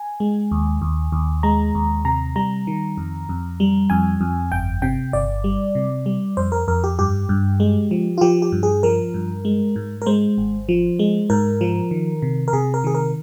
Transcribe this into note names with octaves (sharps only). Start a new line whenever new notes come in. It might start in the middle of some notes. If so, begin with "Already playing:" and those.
Already playing: G#5
G#3
D#2
D#2
D#2
G#3 A#5
D#2
C3 A#5
G3 A#5
D#3
F2
F2
G3
F2 G#5
F2
G1 G5
C3 G5
G1 D5
G3
C3
G3
F2 C5
A#4
F2 A#4
G4
G2 G4
G2
G#3
F3
F4
F3 G4
G4
G2
G#4
F3 A#4
G2
G#3
G#2
A#4
G#3 C5
G#1
F3
G#3
G#2 A#4
F3
D#3
C3
A#4
C3 G#4
A#4
D#3 G#4
A#4